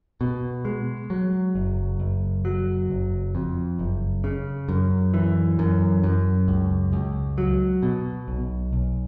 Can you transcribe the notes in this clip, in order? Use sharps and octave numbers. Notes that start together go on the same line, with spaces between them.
B2
G#3
F#3
F#1
F#1
F#3
F#1
F2
F#1
C#3
F#2
E3
F#2
F#2
C#2
C#2
F#3
B2
B1
B1